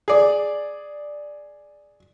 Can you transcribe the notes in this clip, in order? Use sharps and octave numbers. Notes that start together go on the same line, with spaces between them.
G#4 D5